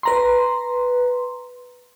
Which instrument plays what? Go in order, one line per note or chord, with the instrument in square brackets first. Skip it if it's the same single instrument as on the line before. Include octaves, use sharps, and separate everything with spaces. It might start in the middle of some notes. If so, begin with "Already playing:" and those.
[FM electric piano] B4 A#5 C6